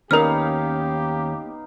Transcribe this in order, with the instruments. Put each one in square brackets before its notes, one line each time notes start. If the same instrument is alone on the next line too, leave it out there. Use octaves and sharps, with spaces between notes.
[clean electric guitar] D#2 C#4 [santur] B3 D#4 F5 [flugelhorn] G4 [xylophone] A#4 F6